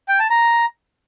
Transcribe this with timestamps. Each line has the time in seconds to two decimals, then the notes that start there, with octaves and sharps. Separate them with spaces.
0.08 G5
0.19 A5
0.30 A#5